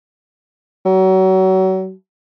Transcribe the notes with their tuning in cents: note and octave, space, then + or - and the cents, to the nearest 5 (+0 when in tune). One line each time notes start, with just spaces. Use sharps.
F#3 +30